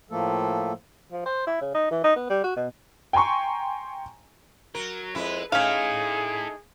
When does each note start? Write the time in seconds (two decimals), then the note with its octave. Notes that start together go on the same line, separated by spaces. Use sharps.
0.11 A2 F3 A3 A#3 A4
1.12 F3
1.26 C5
1.47 E4
1.61 C#3
1.75 D#4
1.91 E3
2.04 D#4
2.16 B3
2.30 G3
2.44 F#4
2.56 B2
3.13 G5 G#5 A#5 C6 C#6
4.75 F#3 A#4
5.15 F2 G#3 E4 B4
5.52 A3 C#4 D#4 E4 G#4 A4 F5